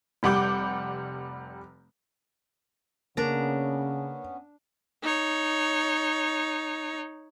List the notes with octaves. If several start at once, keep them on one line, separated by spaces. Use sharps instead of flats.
F1 G3 F#5 D6 G6
C#3 A#3 B3 C#4 D4 A#5
D#4 C#5